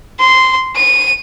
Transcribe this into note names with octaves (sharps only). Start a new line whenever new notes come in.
C6
D#7